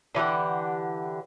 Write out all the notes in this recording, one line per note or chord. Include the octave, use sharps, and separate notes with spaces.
D3 E3 G4 F#5